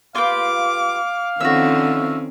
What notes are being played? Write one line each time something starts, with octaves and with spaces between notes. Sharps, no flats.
F4 G4 B4 F5 D6
D3 D#3 F3 C4 C#4 F#4 E5